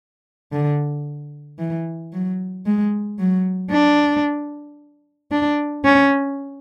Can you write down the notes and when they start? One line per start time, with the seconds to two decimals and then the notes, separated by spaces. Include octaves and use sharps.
0.52 D3
1.59 E3
2.13 F#3
2.66 G#3
3.19 F#3
3.71 D4
5.31 D4
5.84 C#4